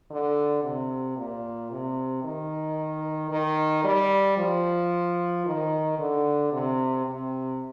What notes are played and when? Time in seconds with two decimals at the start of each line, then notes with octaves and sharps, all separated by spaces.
0.11 D3
0.64 C3
1.17 A#2
1.71 C3
2.24 D#3
3.31 D#3
3.84 G3
4.38 F3
5.46 D#3
5.99 D3
6.53 C3
7.06 C3